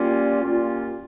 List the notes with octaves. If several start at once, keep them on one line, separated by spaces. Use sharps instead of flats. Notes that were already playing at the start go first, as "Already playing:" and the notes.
Already playing: A#2 G3 A#3 C#4 F4
A#2 G3 A#3 C#4 F4